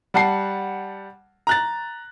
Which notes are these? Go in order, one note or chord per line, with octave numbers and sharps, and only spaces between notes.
G3 F#5 A5 C7
A#5 F#6 A6